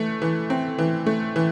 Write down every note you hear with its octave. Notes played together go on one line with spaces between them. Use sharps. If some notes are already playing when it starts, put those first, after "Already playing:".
Already playing: E3 A3
E3
C4
E3
A3
E3